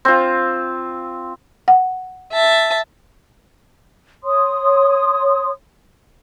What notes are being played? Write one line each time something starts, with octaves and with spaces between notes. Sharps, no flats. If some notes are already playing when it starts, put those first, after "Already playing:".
C4 F4
F#5
E5 A5
C#5 C6 D#6